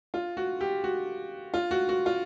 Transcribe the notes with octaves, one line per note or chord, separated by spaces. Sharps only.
F4
F#4
G4
F#4
F4
F#4
F#4
F4